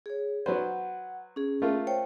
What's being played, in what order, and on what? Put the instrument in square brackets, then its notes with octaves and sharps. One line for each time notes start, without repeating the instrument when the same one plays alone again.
[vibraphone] G#4 C#5
[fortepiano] F#3 B4 C5 [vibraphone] F#5
[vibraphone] C#4 G#4
[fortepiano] A3 A#3 F4
[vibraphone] C5 C#5 G5